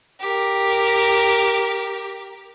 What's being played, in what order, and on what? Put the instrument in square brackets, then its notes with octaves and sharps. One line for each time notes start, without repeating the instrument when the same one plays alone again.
[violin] G4 A#4